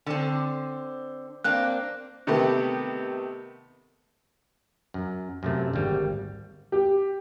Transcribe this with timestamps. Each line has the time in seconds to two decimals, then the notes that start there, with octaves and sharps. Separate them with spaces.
0.06 D3 C4
1.44 A#3 C4 D4 F#6
2.27 C3 D#3 A3 B3 G4
4.94 F#2
5.43 F#2 C3 A3
5.74 G#1 D2 G3
6.72 G4